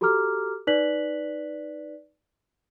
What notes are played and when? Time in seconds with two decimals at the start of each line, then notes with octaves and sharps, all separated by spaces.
0.01 F#4 G4 A4 A#5 D6 F6
0.67 D#4 B4 D5 F#6 B6 F#7